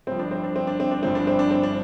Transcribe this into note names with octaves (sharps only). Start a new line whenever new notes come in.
G1 G2 F3 C4
D4
C4
D4
C4
D4
C4
D4
G1 G2 F3 C4
D4
C4
D4
C4
D4